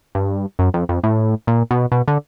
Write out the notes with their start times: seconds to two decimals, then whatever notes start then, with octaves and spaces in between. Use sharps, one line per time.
0.15 G2
0.59 F#2
0.74 F2
0.89 F2
1.04 A2
1.47 A#2
1.71 B2
1.92 B2
2.08 D3